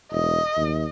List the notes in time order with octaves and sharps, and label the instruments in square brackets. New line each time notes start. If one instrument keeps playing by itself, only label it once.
[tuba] E1 [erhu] D#5
[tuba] D#2